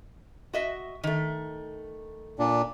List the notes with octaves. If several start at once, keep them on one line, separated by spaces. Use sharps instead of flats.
F#4 D#5 E5
D#3 A3
A#2 D4